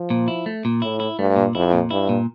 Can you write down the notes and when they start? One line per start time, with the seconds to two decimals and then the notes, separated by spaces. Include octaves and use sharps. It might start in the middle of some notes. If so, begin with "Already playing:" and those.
Already playing: F3
0.10 A#2
0.28 E4
0.46 A3
0.65 A#2
0.82 A2 E4
1.00 E4
1.19 G2 A3
1.36 A#2
1.55 F2 E4
1.73 A#2
1.91 G2 E4
2.09 A#2